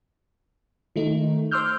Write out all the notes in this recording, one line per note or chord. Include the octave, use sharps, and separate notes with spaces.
D#3 A3 D#4
C5 C6 D6 E6 F6 G6